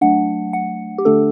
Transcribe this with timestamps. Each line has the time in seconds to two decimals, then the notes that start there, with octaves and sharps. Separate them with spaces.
0.01 F#3 A3 D4 F#5
0.53 F#5
0.98 G4
1.05 D3 A3 D4 A4